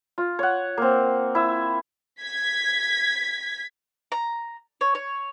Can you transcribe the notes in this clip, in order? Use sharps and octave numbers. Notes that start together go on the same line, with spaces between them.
F4
C#5 F#5
A#3 C4
E4 E6
G#6 B6
A#5
C#5
C#5